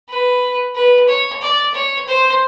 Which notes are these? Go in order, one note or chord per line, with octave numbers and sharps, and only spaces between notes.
B4
B4
C#5
D5
C#5
C5